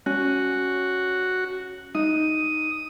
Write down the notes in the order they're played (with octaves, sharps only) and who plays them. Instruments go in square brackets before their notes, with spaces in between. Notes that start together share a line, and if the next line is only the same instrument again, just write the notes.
[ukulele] C#4 [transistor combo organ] F#4
[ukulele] D#4 [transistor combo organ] D#6